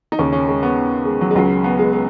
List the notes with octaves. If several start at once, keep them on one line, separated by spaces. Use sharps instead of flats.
D#4
D#2 C#3 C#4
C#4
G#3
B3
G#3
F#3
G#3
C#2 C#3 F#3
B3
G#3
G#3